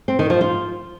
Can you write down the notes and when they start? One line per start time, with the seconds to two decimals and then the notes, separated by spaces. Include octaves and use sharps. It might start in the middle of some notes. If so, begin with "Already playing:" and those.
0.08 C4
0.19 D#3
0.30 F3
0.41 F4